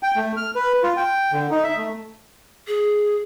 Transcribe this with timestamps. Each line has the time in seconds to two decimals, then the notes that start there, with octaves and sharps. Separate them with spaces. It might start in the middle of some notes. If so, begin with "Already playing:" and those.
0.03 G5
0.16 A3
0.37 F6
0.55 B4
0.83 F4
0.97 G5
1.32 D3
1.51 D#4
1.63 E5
1.77 A3
2.68 G#4